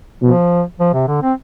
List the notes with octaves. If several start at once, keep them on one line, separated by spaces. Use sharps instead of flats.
B2 F3
F3
C3
D3
C4